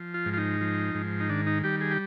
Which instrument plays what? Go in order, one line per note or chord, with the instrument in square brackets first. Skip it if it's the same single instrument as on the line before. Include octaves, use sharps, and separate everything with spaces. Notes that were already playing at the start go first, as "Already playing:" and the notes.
Already playing: [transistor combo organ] F3
F4
G#2
F4
D#4
F3
G#2
D#4
D#3 D4
D#4
G3 G4
G#4
G4